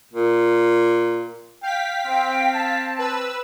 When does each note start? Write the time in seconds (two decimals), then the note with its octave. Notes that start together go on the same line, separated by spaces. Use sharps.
0.13 A#2
1.63 F5 G5 B6
2.05 C4 G5
2.53 A5
2.99 B4 E6